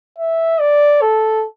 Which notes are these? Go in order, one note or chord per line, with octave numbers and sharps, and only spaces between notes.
E5
D5
A4